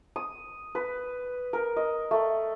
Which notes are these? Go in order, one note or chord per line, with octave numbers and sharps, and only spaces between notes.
D#6
B4
A#4
D#5
A3